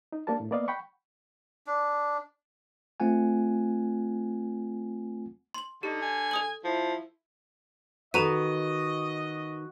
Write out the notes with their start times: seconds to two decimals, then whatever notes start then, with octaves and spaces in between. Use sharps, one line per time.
0.12 D#4
0.27 A#3 D4 G4 A#4 A5
0.40 A2
0.51 A#3 B3 D5 D#5 F5
0.68 F#5 G5 B5 C#6
1.67 D4
3.00 A3 C4 F4 F#5 G#5
5.54 C6 F#7
5.83 D3 D#4 G4
6.02 G#5
6.31 A4 D#6 F#7
6.64 F3 E4
8.14 D#3 F#4 A4 B4 D#5 A#5 D#7